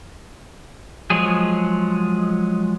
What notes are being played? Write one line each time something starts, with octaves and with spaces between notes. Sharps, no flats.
F3 F#3 G#3 G#4